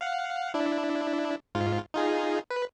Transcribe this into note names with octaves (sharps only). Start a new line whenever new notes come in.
F5 F#5
D4 E4
G#2 F4
D#4 F4 G#4
B4